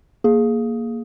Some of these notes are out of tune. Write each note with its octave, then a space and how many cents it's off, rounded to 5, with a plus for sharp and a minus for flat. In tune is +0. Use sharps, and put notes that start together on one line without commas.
A#3 +0 G#4 +10